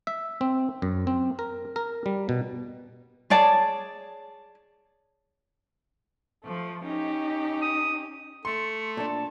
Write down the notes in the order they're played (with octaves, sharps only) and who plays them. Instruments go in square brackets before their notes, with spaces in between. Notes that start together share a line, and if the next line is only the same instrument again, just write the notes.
[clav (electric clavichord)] E5
C4
F#2
C4
A#4
A#4
G3
B2
[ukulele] G#4 C#5 D5 A5
[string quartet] F3 A3
C#4 D#4 G4
[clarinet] D#6
[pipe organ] A3 [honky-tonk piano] C6 [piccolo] C#7
[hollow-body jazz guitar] A#2 D4 [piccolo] A5